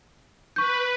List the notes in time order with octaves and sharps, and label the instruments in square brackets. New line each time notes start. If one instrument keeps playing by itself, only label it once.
[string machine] B4 [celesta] C#6 G6